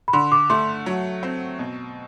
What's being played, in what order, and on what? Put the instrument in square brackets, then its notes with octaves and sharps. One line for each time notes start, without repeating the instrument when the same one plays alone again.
[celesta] B5
[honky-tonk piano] D3 [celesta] C6
[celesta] D6
[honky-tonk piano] A3 [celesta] C6
[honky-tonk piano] F#3
C4
B2